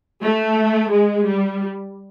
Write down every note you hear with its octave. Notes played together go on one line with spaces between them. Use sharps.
A3
G#3
G3